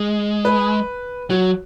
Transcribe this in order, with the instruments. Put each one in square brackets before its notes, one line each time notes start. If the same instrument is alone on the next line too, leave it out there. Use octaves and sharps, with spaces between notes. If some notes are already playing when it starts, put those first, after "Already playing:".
Already playing: [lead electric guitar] G#3 [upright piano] G#4
[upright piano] B4
[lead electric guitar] F#3 [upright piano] F#4